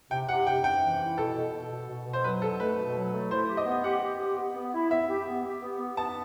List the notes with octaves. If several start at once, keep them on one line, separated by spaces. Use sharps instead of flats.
C3 G5
C3 F#5
C3 G5
C3 G5
E3
E4
B2 A4
B2
B2
B2
B2
B2
C5
F#3 B4
B2 A4
A3 B4
B2
F#3
A3
E4 C5
G4
D#5
B3
G4 F#5
G4
G4
B3
B3
E4
B3 E5
G4
B3
G4
B3
B3
B3 A5